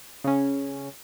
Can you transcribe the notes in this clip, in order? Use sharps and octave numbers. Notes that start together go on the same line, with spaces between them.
C#3 C#4